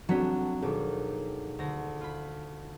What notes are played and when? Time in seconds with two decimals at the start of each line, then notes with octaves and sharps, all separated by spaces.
0.09 F1 F#3 B3 C4 D4 C#6 B6
0.62 D#2 B2 G#4 A4
1.59 D2 A#6
2.01 F4 B5